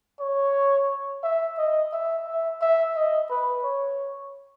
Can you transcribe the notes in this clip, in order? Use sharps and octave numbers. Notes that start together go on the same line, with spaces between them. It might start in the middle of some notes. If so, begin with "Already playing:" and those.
C#5
E5
D#5
E5
E5
E5
D#5
B4
C#5